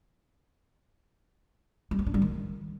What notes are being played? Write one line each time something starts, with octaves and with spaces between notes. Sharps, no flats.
G3
B3
D4
G3
D#3